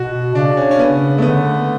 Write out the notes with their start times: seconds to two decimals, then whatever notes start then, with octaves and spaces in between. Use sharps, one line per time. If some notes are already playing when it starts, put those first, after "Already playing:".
Already playing: B2 F#4
0.35 C#3 D4
0.57 C#4
0.71 C#4
0.79 B3
1.18 A3
1.22 D3 B3